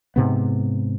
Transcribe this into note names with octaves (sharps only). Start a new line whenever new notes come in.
G#2 C3 B3